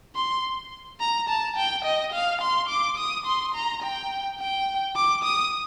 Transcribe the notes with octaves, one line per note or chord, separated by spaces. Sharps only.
C6
A#5
A5
G5
D#5
F5
C6
D6
D#6
C6
A#5
G5
G5
D6
D#6